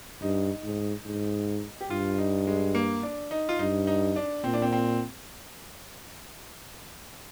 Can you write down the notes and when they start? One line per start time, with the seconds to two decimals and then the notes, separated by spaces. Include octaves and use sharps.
0.22 G2 D#4
0.64 G#2
1.06 G#2
1.81 G4
1.90 G2 F4
2.18 D#4
2.47 G#3
2.75 A#3
3.03 D4
3.31 D#4
3.49 F4
3.59 G2 D#4
3.87 D#4
4.16 D4
4.44 A#2 C4
4.54 D4
4.62 C4
4.72 C4